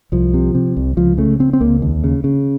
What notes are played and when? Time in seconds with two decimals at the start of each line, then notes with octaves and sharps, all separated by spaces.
0.12 C2 F3
0.34 C3
0.55 C3
0.77 C2
0.97 C#2 F3
1.18 C#3 A3
1.39 C#3 C4
1.53 C4
1.61 C#2 A#3
1.82 D#2
2.04 C#3
2.24 C#3